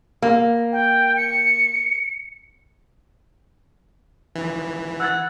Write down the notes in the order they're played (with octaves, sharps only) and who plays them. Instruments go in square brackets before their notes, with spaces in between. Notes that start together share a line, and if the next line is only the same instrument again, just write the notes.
[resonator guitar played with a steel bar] A#3
[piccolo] G5
C#7
[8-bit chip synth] E3
[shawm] F#5 [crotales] E6 G#6 A6